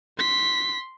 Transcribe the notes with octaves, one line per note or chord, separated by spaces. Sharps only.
C6 B6